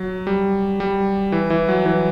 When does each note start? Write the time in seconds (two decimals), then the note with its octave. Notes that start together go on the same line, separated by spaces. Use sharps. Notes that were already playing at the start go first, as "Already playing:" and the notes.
Already playing: F#3
0.27 G3
0.80 G3
1.32 E3
1.50 E3
1.68 F#3
1.86 E3